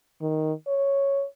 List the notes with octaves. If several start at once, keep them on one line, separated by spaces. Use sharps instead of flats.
D#3
C#5